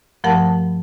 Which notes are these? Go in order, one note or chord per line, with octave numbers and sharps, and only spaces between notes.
G2 F3 A3 A#4 F#5 A5